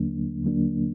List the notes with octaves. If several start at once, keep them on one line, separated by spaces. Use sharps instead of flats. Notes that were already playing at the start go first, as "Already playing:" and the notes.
Already playing: D#2 D3 F#3 A#3 D4
D#2 D3 F#3 A#3 D4